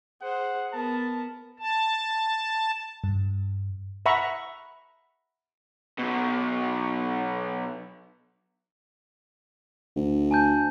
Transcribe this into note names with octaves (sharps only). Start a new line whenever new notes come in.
G#4 C5 F#5
B3 A#4 A5
A5
G2
E5 F#5 A#5 B5 C#6
B2 F#3
D2
G#5 A5 G6